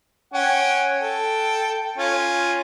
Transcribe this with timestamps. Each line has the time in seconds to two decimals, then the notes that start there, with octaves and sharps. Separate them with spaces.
0.33 C#4 F#5 G5
1.00 A4 G5
1.98 C#4 F4